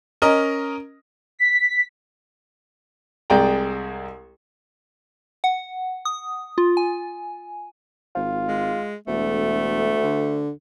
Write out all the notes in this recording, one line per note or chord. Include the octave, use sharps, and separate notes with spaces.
C#4 A#4 D#5
B6
C2 G#3 D5 G5 A#5
F#5
D#6
F4
G#5
G#1 F4
G#3
E1 D2 A3
D3